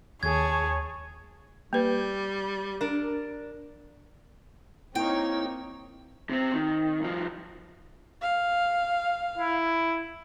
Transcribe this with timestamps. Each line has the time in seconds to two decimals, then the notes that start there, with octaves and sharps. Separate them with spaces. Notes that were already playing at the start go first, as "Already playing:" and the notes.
0.23 D#2 G#4 C#5 A5 G#6
1.73 G3 A#3 B4
2.81 D4 A#4
4.95 A#3 C4 D#4 E4 C#5 G5
6.30 C3 C4
6.53 D#3
7.00 C2 F3
8.22 F5
9.37 E4